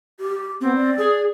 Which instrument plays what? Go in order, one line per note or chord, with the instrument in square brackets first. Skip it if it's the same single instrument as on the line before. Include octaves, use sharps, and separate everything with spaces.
[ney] G4
[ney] B3 [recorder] C4
[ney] D5
[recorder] G#4